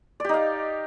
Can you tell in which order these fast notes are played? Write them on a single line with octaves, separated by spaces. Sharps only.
D5 G4 D#4 F5